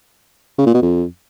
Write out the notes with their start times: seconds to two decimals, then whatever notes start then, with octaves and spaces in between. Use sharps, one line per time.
0.58 C#3
0.66 A#2
0.74 B2
0.82 F2